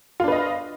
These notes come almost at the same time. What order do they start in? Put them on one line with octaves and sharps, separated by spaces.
F4 D4 B4 D#5 F5